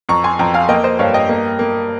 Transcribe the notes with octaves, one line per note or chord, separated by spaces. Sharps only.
F2 A#5 C#6
G#5 C6
F2 G5 A#5
F5 G#5
A#3 D#5 G5
C5 D#5
G2 C#5 F5
D#5 G5
A#3
A#3